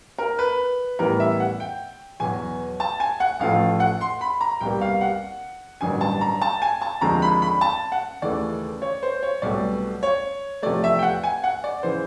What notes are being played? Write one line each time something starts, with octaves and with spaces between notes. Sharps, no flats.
A#4
B4
A1 A2 E3 G3 B3 A#4
E5
F#5
G5
E2 B2 F#3 G#5
A5
G#5
F#5
A1 A2 F3 A3 F5
F#5
C6
B5
A#5
C2 B2 G3 A#3 G5
F5
F#5
A1 G2 D3 F#3 A#3 G#5
A5
A#5
A5
G#5
A5
D#2 D3 F3 G#3 C4 A#5
B5
B5
A5
F#5
D#2 C#3 E3 A3 D5
C#5
C5
C#5
C2 B2 F#3 A3 D5
C#5
E2 C3 F3 A3 D5
E5
G5
F#5
G#5
F#5
D5
C#3 E3 C5